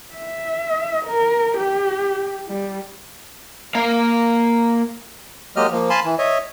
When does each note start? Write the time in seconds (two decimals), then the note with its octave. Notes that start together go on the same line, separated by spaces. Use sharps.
0.15 E5
1.06 A#4
1.58 G4
2.48 G3
3.75 A#3 F5
5.56 F#3 G#3 A#3 G4 D#5 F6
5.72 F3 A#3
5.90 F5 G#5 A5 B5 C6
6.05 E3
6.18 C#5 D#5 E5